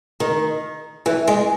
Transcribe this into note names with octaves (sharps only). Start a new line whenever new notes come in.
D#3
E3
G#3